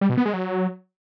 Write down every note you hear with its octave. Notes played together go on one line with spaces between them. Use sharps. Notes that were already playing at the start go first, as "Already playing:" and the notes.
G3
B2
B3
G#3
F#3